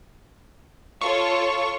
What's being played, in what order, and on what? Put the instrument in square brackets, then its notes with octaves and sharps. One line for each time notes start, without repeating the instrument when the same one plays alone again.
[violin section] F4 A4 C#5 [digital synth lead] C#6